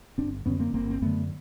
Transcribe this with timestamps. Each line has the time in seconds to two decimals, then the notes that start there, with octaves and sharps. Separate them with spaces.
0.18 G1 C4 D4
0.46 F#2 D3 B3 C#4
0.59 A#3 C4
0.73 G1 A#3 C4
0.90 C4
1.02 F#2 D3 A3 B3